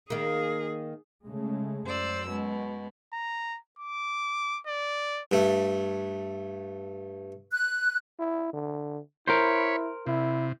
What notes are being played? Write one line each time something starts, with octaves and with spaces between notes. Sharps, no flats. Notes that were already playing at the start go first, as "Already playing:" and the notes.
D#3 A#3 G#4
C#3 G#3 A3
F#2 C5 D5 E6
B2 G#3
A#5
D6
D5
G2 A3
F#6
E4
D3
E4 A#4 C5 C#5 B5
C3 E4